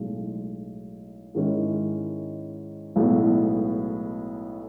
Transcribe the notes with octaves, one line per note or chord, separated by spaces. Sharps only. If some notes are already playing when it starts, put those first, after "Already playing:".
Already playing: B1 A2 G#3
G#2 D#3 G#3 C#4 E4
B1 A2 G#3 B3